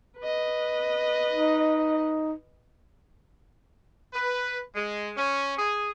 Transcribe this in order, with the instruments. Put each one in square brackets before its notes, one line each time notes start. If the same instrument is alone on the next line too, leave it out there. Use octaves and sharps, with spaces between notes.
[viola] B4 D#5
[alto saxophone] D#4
[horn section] B4
G#3
C#4
G#4